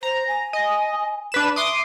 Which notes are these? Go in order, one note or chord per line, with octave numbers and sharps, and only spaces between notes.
C5 A#5
G#5
D#5
D4 B4 E7
E5 C6 D6 D#6